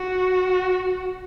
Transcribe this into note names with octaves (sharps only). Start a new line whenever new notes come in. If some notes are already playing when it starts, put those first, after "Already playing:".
Already playing: F#4